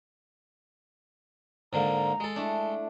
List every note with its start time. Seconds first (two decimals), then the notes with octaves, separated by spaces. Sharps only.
1.73 G#2 D3 A#3 A#5
2.20 G#3 A4
2.36 A3 D4 E4